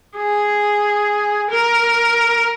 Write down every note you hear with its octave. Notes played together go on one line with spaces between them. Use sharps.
G#4
A#4